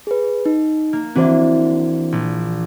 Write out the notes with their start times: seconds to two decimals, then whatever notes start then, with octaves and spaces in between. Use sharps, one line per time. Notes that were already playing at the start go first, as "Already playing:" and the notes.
0.07 G#4 B4
0.46 D#4
0.93 A#3
1.16 E3 C4 D4 F#4 C5
2.12 A#1